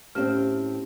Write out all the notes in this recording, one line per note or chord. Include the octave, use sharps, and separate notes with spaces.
A2 C4 C#4 G4 F6